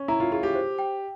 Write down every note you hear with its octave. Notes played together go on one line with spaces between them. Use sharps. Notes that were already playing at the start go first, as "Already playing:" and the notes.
Already playing: C#4
E4 A#5
F4
F4 G#4
G4
C5
G5